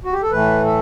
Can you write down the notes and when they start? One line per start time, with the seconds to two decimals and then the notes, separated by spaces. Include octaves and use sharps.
0.05 F#4
0.13 G4
0.23 A4
0.32 A2 E3 A3 B4
0.65 A4